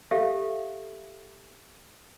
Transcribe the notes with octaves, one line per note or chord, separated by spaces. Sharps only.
G4 A4 E5 F5